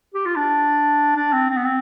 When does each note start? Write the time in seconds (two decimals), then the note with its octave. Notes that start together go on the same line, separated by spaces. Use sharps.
0.14 G4
0.26 F4
0.36 D4
1.16 D4
1.33 C4
1.50 C4
1.57 B3
1.65 C4